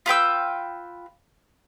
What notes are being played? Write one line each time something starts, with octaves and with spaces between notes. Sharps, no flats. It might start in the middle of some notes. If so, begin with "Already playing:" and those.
F4 B4 G5 E6